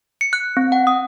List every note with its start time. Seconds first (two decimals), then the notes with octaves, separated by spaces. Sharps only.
0.21 C#7
0.33 F#6
0.57 C4
0.72 F#5
0.87 D#6